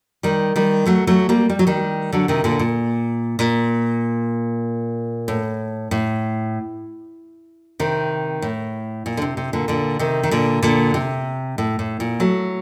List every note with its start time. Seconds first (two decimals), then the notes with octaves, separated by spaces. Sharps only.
0.23 D#3 G3
0.56 D#3 G3
0.86 F#3 A3
1.07 F#3 A3
1.29 G3 A#3
1.50 G3
1.59 F#3
1.67 D#3 G3
2.12 D3 F#3
2.28 C3 D#3
2.44 A#2 D3
2.59 A#2
3.39 A#2
5.28 A2
5.91 A2
7.80 C3 D#3
8.42 A2
9.06 A#2
9.17 D3
9.22 C3
9.37 C3
9.53 A#2 D3
9.68 A#2 D3
9.99 C3 D#3
10.23 D#3
10.31 A#2 D3
10.62 A#2 D3
10.94 C3
11.58 A2
11.79 A2
12.00 A#2
12.20 F#3 A3